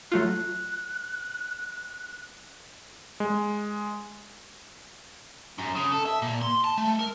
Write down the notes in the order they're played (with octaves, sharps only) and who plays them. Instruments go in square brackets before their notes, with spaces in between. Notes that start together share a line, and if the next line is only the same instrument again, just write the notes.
[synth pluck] F#3 A3 F4 [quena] F#6
[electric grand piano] G#3
[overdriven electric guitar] F#2
C#3
A4
E5
A#2
C6
A5
A3
A#4